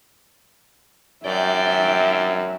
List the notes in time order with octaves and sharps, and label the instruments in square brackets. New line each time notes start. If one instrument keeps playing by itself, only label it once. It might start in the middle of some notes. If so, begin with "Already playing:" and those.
[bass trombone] F#2 [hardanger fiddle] D5 G5 [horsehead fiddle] E5